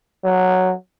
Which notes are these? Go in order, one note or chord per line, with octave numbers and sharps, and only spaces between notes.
F#3